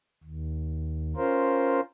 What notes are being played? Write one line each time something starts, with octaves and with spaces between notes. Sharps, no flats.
D#2
C#4 F4 A#4 C5